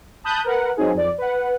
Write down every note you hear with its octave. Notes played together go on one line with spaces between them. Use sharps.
A5 B5 D#6 F#6 G6
A#4 B4 F#5
F#3 C4 D#4 G#4
F2 D5
B4 F#5